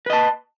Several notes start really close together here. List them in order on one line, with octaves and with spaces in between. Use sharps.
B4 D#5 A5